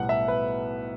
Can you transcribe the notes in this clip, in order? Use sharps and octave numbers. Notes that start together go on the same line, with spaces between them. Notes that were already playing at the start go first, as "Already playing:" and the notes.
Already playing: B1 A2 G3 B3 F#5
E5
B4